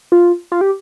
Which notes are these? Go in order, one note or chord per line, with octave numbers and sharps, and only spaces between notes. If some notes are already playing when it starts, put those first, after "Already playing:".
F4
F4
G4